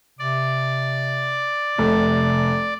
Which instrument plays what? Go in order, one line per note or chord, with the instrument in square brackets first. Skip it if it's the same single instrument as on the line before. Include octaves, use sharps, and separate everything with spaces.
[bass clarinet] C3 [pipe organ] D5
[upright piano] F1 [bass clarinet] C3